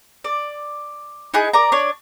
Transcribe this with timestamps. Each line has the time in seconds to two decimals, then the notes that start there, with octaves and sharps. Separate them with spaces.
0.24 D5
1.34 D#4 E4 G#4 F#6
1.53 A#4 D5 A#5
1.72 D4 C#5